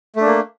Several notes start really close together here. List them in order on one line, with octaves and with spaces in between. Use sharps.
A3 D4 A#3